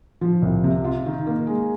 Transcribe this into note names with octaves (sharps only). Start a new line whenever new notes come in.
F3
C2
C3
F4
D#3
A#3
G#3